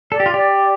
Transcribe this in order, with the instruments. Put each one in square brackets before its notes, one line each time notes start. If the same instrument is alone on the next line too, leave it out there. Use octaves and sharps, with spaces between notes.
[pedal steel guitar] A4 [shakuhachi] D5
[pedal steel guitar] G4
F4
[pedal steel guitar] G4 [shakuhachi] D5